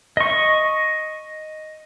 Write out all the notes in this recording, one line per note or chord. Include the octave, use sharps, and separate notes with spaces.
D#5 C#6